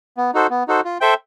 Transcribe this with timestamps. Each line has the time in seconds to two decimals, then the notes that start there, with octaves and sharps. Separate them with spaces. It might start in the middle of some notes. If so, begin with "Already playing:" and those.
0.17 B3
0.34 D#4 F#4 A4 C5
0.50 B3
0.68 D#4 F#4 A4 C5
0.84 F4
1.01 A4 C5 E5 G5